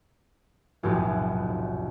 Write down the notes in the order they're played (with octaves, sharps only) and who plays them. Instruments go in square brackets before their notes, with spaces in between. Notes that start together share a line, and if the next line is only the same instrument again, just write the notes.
[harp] F1 B1 F#2 A2 A3 G4